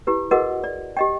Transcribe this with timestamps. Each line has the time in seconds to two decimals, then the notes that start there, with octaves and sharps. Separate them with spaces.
0.07 E4 G4 B4
0.31 F#4 G#4 A#4 B4 D#5 F#5
0.64 D5
0.97 G4 D#5 G5